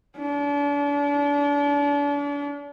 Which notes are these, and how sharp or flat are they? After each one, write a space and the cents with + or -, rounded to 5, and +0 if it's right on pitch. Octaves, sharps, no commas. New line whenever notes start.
D4 -40